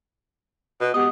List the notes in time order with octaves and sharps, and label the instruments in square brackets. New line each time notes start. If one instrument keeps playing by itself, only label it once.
[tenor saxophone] B2
[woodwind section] G#3 B3 G4 [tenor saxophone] D#5